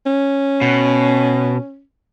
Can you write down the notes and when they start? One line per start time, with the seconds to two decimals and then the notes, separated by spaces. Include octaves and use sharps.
0.07 C#4
0.62 B2